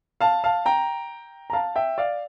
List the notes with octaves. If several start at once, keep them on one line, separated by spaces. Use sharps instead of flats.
F5 A5
F5 A5
G5 A#5
A#5
F5 A5
E5 G5
D5 F5